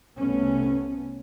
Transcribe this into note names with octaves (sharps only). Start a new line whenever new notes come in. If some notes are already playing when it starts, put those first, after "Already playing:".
C2 C3 A3 B3 C#4